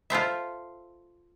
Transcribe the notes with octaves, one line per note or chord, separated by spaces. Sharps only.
F4 A4 C5 E5